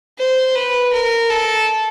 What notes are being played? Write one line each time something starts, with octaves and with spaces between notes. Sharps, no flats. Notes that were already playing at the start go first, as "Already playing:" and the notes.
C5
B4
A#4
A4